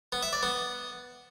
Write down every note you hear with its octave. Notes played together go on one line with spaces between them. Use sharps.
B3
E5
D5
B3